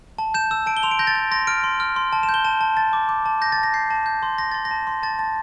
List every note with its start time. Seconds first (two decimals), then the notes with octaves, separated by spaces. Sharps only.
0.19 A5
0.34 G6 E7
0.51 E6 E7
0.66 A5 D7
0.77 G7
0.83 C6 F7
0.91 D7
0.99 G6 A#6
1.07 A6
1.15 G6
1.31 C6 A#6
1.47 F6 D7
1.64 C6
1.80 F6
1.96 C6
2.13 A5
2.23 E7
2.29 G6
2.34 G7
2.44 A5 E7
2.61 A5
2.77 A5 A6
2.93 D6
3.09 D6
3.26 A5
3.41 G6 A#6
3.52 A6
3.58 A5
3.63 A#6
3.74 G6 C7
3.90 A5
4.06 G6
4.23 C6
4.38 C6 A#6
4.51 C6 A6
4.65 A#6
4.71 A5
4.87 C6
5.03 A5 A6
5.19 A5 A6